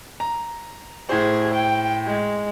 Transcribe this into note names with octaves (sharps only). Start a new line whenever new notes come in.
A#5
A2 G#4 C5
G5
G#3